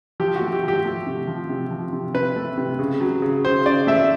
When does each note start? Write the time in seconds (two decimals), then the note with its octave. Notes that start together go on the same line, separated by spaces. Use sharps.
0.20 F3 G4
0.35 F#4
0.41 A3
0.53 G4
0.63 F3 G4
0.85 A3
1.07 C3
1.27 F3
1.49 C3
1.71 F3
1.93 C3
2.14 C3 B4
2.36 A3
2.57 C3
2.79 C#3
3.01 F#3
3.22 C#3
3.45 C#3 C5
3.66 C#3 D5
3.87 A3 E5